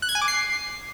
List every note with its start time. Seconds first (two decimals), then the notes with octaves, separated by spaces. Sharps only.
0.02 F#6
0.09 G#6
0.15 G#5
0.21 D6
0.28 C7